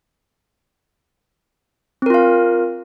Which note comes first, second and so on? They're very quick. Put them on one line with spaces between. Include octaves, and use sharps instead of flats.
C4 A#4 F4 F5